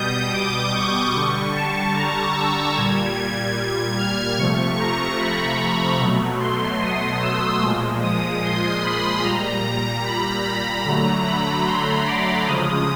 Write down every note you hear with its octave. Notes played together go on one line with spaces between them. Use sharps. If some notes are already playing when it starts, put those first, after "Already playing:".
Already playing: B2 G3 D#6 G6
D6
C#6
D3 G3 C#6
A5
A#5
E6
A#2 G3 G#6
G#6
G#6
F6
C3 F3 A3 C#6
A#5
B5
B2 F#3 A3
C6
D#6
E6
A#2 F3 G#3
D#6
C6
B5
A#2 G3 A#5
A#5
B5
B5
D3 F#3 A3 A#5
B5
C6
D6
C#3 F3 G#3 D#6